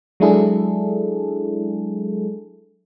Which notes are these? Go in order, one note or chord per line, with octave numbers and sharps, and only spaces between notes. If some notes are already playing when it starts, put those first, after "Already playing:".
F#3 G#3 D4 E4 G#4 A4